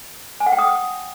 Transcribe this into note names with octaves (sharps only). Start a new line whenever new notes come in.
G#5
F#5
G5
D#6